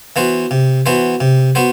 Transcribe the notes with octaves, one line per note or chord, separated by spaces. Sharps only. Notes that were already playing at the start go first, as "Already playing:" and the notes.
E3 B3 F#4 C5
C3
E3 B3 F#4 C5
C3
B3 F#4 C5